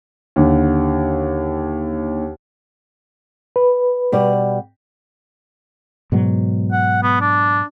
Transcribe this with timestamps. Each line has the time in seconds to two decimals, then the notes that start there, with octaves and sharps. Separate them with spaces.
0.36 D#2 D3
3.56 B4
4.12 B2 G3 D5
6.12 G#2 B2 F#3
6.72 F#5
7.03 B3
7.21 D4